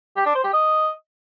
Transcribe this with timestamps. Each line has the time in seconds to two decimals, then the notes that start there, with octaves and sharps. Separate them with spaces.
0.16 G4
0.26 D4
0.35 C5
0.44 G4
0.53 D#5